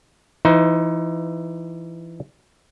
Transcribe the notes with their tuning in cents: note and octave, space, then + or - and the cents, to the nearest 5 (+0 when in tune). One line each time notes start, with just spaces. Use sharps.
E3 +25 D#4 +25 C5 -20